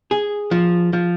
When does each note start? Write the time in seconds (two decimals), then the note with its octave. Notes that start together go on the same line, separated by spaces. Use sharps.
0.11 G#4
0.51 F3
0.93 F3